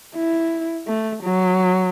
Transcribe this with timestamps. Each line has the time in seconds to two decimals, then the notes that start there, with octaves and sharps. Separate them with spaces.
0.16 E4
0.87 A3
1.23 F#3